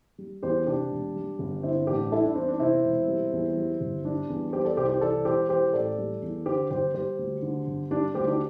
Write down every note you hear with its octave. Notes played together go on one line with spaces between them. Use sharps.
G3
E2 G4 C5
C3 D4 G4
E1
G3
G1
D3 C4 E4
A1 D4 G4
G3 E4 A4
D4
E2 C4
D4
C3 C4 E4
E1
G3
E2
G3
G1
G3 D4
E2
G3 G4 C5
A4 D5
C2 G4 C5
G4 C5
E3 A4 D5
E1 G4 C5
E3 G4 C5
A1 A4 D5
G3
E2
D3 G4 C5
G1 G4 C5
G3 G4 C5
D2
D3
G1
G3 D4 G4
D2 G4 C5
D4 G4